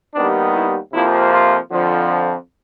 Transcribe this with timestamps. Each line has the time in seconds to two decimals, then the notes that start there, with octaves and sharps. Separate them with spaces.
0.14 D#2 D#3 G3 B3 D4
0.54 E4
0.92 F2 C3 F3 A#3 E4
1.31 F4
1.70 F2 D3 F3